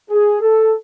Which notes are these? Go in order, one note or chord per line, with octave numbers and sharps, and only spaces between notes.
G#4
A4